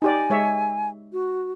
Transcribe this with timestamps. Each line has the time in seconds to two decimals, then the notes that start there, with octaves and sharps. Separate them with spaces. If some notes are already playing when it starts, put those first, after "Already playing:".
0.02 D#4 G4 D5 G#5
0.30 G#3 C#5 E5
1.13 F#4